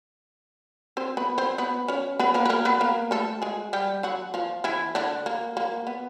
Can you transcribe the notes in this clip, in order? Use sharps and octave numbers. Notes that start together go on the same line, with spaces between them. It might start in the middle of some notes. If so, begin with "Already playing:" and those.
C4 C5
B3 B4
C4 C5
B3 B4
C#4 C#5
B3 B4
A#3 A#4
B4
A#3 A#4
B3 B4
A#3 A#4
A3 A4
G#3 G#4
G3 G4
F#3 F#4
F3 F4
E3 E4
D3 D4
A#3
A#3
B3